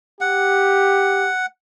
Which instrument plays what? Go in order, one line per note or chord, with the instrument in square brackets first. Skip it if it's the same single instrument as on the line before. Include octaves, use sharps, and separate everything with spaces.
[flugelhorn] G4 [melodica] F#5